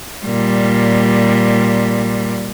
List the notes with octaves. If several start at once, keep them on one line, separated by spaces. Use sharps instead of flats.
A#2 G3